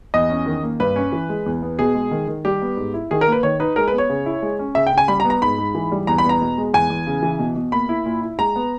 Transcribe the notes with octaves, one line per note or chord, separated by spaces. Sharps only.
E2 D#5
C#4
D#3
A#3
G2 B4
C#4
E3
G#3
E2
B3
B2 G#4
G#3
D#3
D#3
G3 G4
B3
G#2
E4
D#3 G#4
A#4
A#3 B4
D#3 C#5
D#4 B4
G#3 A#4
B4
B3
C#5
C#3
E4
G#3
C#4
C#3 E5
G5
C#3
G#5
G3 B5
A#5
B3
A#5
G#2 B5
G#2
E3
G3
E2 A#5
B5
B3
A#5
B2
G#3
E2 G#5
E2
C#3
E3
B2
B2
A#3 B5
E4
A#2
E4
G#3 A#5
B3